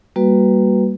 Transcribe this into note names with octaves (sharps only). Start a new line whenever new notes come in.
G3 A#3 F#4 B4